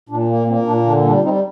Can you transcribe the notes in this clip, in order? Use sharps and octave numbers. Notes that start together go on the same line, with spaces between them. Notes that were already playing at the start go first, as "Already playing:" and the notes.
A#2 D4
A#3
A#3 C4
A#2 D4
D3 D4
G3 D4
G3 C4 D#4